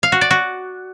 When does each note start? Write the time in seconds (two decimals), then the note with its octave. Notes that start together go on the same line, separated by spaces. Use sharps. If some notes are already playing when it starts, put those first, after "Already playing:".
0.03 F5
0.12 F#4
0.21 D5
0.31 F#4